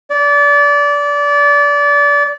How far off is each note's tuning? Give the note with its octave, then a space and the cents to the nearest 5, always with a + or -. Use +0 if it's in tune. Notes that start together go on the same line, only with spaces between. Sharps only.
D5 -25